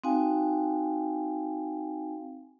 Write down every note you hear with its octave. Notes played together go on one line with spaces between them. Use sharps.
C4 D#4 F#4 F5 G5 G#5